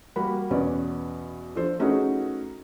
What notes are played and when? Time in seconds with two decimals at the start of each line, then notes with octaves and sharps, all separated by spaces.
0.16 G3 A#3 F#4 B5
0.50 E2 B2 B3 C#4 D5
1.55 F3 D4 A4 C5
1.79 A3 C#4 D#4 F#4 G#4 B4